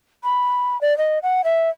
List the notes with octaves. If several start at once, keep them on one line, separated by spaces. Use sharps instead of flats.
B5
D5
D#5
F#5
E5